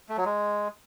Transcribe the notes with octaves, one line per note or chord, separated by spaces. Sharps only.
A3
F#3
G#3